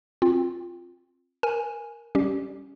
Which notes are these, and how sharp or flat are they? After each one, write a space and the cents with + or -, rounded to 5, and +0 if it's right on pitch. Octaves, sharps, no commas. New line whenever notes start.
C4 +15 F4 +0
A#4 +0 G#5 +0
G3 +0 C#4 +0 G4 -15